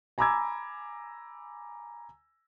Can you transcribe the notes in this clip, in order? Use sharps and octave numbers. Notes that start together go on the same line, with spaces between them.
G#5 A#5 B5 D6 E6 G#6